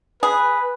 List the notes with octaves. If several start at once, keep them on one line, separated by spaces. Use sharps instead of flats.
G#4 B4